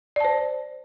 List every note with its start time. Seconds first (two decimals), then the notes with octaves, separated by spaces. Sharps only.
0.16 D5
0.20 A5
0.25 C5